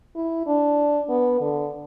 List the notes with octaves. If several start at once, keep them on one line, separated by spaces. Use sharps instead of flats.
E4
D4
B3
D3